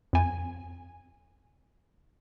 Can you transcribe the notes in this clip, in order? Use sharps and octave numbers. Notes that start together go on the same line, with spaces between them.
F2 G#5